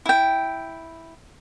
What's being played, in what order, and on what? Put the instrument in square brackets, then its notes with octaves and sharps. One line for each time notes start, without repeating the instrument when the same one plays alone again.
[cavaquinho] E4 G5